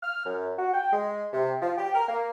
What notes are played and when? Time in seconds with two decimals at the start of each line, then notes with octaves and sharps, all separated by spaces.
0.02 F6
0.25 F#2
0.58 F#4
0.73 G5
0.93 G#3
1.33 C3
1.62 F3
1.78 G4
1.94 A#4
2.09 A#3